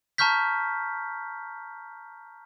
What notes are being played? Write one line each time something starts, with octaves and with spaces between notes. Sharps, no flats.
A5 A#5 C#6 F6 G6 B6